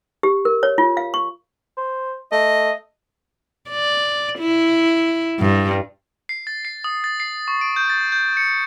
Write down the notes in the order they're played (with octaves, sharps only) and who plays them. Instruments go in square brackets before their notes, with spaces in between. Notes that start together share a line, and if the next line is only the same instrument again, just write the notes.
[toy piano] G4
A#4
C#5
F4
F5
C#6
[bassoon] C5
[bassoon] A3 [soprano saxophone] D#5
[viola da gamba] D5
E4
G2
[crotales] C7
A6
C7
D#6
A6
C7
C#6
D7
G6
A6
G6
C#7